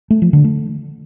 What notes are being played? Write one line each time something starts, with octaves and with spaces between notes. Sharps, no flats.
A3
F3
D3
A3